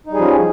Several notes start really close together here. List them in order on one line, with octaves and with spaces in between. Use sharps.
D#4 G3 G#4 F3 C#4